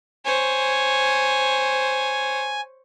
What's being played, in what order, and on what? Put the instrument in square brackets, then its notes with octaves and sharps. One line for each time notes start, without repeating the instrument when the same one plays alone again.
[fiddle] C5 C#5 [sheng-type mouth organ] G#5